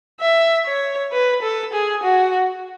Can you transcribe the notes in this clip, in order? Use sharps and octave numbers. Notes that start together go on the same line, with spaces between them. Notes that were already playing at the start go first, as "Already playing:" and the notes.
E5
C#5
B4
A4
G#4
F#4